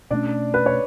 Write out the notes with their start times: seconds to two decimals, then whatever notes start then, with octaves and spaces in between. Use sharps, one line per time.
0.11 B2 A3 C#4 D4 D5
0.54 B4
0.66 C#5